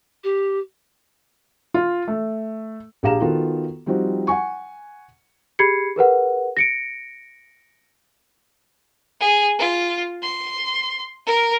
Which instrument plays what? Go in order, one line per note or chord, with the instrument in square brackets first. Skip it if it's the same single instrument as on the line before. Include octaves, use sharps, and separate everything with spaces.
[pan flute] G4
[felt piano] F4
A3
A#1 G4 G#4 F5 A#5 E7
D#3 B3 F4 F#4 A4
F3 G3 C4 D#4 F4 F#4
F#5 G#5 C#6
[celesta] G4 G#4 B5 G#6 C7 C#7
G#4 A#4 B4 F#5
A#6 C#7 D7
[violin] G#4
F4
C6
A#4